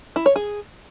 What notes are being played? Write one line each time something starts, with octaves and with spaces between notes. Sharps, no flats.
E4
C#5
G#4